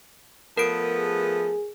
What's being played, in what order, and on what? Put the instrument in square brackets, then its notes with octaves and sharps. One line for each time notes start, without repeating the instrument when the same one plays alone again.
[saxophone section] F3 A3 B3 [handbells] A#4 D7
[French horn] G#4